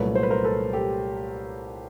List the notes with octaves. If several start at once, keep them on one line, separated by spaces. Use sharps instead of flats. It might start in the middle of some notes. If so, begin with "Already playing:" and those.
Already playing: C2 A#2 F#3 A3 B4 C#5
C5
B4
A#4 C5
A4 B4
G4 A4